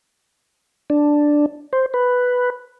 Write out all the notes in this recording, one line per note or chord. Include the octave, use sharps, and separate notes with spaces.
D4
C5
B4